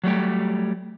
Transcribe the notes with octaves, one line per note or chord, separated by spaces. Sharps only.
F#3 G3 A3 G4